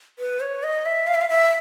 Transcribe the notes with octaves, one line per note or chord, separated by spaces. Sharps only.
B4
C#5
D#5
E5
F5
E5
F5
E5